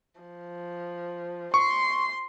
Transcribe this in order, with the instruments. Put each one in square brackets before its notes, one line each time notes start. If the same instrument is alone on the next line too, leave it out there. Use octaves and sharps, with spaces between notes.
[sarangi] F3
[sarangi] C6 [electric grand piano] C#6